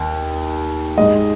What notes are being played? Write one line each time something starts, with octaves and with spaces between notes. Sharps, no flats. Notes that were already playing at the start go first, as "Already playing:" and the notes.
Already playing: D#2
G#2 G#3 D#5